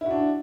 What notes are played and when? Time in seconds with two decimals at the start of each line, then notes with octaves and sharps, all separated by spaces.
0.01 E4
0.06 F#4
0.11 D4